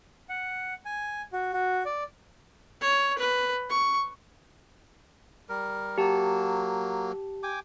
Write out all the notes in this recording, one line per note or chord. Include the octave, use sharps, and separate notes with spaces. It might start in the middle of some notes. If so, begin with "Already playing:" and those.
F#5
G#5
F#4
F#4
D5
C#5
B4
C#6
G3 A#4
F#3 A#3 G4 A5
G5 G#5 D6